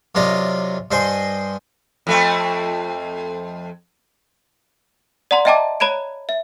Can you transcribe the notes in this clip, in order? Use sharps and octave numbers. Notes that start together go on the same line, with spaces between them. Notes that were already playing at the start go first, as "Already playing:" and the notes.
F#2 C3 F4 D5 D#5
G2 C5 D#5 G#5 C6
F2 A3 C4
D5 F#5 A#5 C6
D#5 E5 G5 A5 A#5 D6
C#5 A#5 B5 G#6 D7
E5